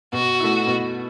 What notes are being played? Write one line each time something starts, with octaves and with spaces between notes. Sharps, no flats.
B2 F#4
A3 E4
B2